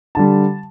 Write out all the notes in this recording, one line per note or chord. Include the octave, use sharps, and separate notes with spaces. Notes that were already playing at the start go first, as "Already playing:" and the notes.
D3 G3 A5